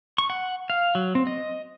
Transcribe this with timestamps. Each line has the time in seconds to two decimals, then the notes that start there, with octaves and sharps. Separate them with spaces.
0.18 C#6
0.30 F#5
0.70 F5
0.95 F#3
1.15 C4
1.27 D#5